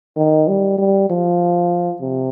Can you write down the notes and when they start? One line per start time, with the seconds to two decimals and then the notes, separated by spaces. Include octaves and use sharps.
0.17 D#3
0.48 G3
0.78 G3
1.09 F3
2.01 C3